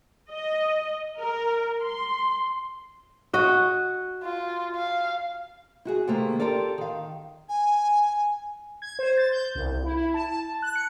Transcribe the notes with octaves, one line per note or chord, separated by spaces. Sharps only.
D#5
A#4
C6
F#4 D#5
F4
F5
E4 F#4 G#4
C3 D#3 A3 A#3
F4 G4 A4 A#4 D5
D#3 F5
G#5
G#6
C5
A6
G6
C2
E4
E4
A5
A5
F#6
C#7